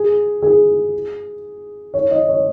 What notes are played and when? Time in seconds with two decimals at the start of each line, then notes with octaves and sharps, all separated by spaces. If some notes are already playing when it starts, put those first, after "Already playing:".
Already playing: G#4
0.42 G#4
1.94 C#5
2.11 D#5
2.28 C#5